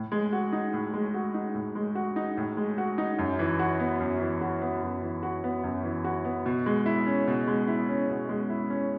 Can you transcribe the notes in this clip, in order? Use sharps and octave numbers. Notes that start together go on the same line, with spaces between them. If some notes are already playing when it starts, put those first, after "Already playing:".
Already playing: A2
G#3
F#4
D#4
A2
G#3
F#4
D#4
A2
G#3
F#4
D#4
A2
G#3
F#4
D#4
F#2
E3
F#4
B3
F#2
E3
F#4
B3
F#2
E3
F#4
B3
F#2
E3
F#4
B3
B2
G#3
E4
C#4
B2
G#3
E4
C#4
B2
G#3
E4
C#4